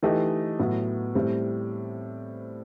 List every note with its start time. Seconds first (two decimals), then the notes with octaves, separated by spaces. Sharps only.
0.03 E3 A3 D#4 G4 D#5
0.59 A2 F#3 B3
1.15 A2 G3 C4